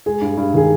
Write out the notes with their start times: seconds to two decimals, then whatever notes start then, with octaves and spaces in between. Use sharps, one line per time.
0.06 G#3 G#4
0.22 G2
0.37 G2
0.53 D#3 G#4